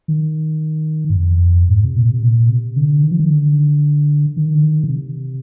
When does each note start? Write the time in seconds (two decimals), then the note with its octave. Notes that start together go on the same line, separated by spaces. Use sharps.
0.08 D#3
1.10 G2
1.16 F2
1.69 G#2
1.84 C3
1.96 A#2
2.10 C3
2.23 A#2
2.50 C3
2.76 D3
3.03 D#3
3.11 F3
3.20 D#3
3.30 D3
4.37 D#3
4.55 D3
4.63 D#3
4.84 D3
4.90 C3